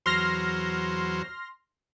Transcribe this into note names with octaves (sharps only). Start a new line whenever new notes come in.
E2 F#3 C5 C6 F6 A#6